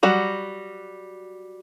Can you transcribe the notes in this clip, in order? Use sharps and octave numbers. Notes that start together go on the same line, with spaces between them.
F#3 G3 F#4 F#5